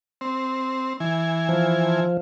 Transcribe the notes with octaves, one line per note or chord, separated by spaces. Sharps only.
C4
E3 G#5
F3